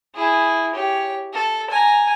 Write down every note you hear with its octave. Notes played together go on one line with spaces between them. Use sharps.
E4 G#4
G4 C#5
A4
G#5 A#5